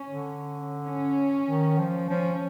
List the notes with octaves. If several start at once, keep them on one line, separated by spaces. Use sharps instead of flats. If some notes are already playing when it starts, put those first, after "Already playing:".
Already playing: C#4
D3
C#4
D#3
F3
F3 C#4